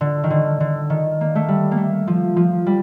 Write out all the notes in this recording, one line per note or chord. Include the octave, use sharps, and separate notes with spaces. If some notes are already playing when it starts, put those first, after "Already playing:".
D3
D#3
D3
D3
D#3
A#3
A3
G3
A#3
A3
F3
F3
G3